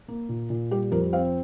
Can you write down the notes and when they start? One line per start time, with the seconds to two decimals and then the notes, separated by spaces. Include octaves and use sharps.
0.08 A#3
0.29 A#2
0.50 A#2
0.71 G3 G4
0.91 F2 A#4
1.13 C4 F5